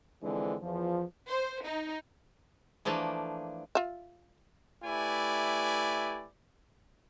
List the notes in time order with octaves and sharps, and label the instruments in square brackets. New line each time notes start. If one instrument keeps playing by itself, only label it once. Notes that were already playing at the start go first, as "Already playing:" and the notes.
[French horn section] D3 E3 F3 G#3 C4 D4
E2 F3
[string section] C5
D#4
[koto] E3 F3 A3 A#3 D4
[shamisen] F4 E5
[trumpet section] A3 E4 G4 B4 D5 G#5